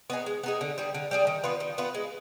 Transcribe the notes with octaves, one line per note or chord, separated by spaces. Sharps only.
B3 D#4 G#4
G#3
B3 D#4 G#4
D3
G3 D4 G#4
D3
G3 D4 G#4
D#3
B3 F4 B4
D#3
B3 F4 B4
G#3